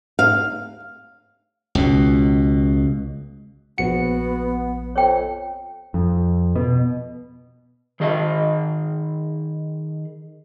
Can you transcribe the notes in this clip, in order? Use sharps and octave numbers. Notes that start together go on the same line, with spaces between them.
F5
C#2 B2
A#1 B3 F#4 C#7
F2 C#5 G5
F2
B2
D#3 G#4 D#5